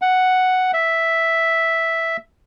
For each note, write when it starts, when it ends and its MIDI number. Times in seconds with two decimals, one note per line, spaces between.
0.02 0.71 78
0.74 2.17 76